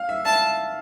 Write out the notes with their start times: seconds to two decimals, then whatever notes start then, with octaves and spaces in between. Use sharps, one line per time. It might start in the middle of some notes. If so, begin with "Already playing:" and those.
Already playing: F5
0.09 E5
0.25 E5 A5